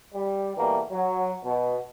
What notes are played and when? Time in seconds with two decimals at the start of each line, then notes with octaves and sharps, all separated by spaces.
0.15 G3
0.57 B2 E3 G3 A3 A#3
0.91 F#3
1.44 B2